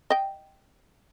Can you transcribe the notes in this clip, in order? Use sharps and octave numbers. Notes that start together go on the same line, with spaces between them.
D#5 G5